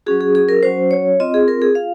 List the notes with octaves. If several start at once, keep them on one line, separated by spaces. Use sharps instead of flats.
F#3 C#4 F#4 G#4
G#4
G#4
A#4
F#3 C#4 F#4 C5
C#5
C4 F4 D#5
G#4
A#4
G#4
F4 F5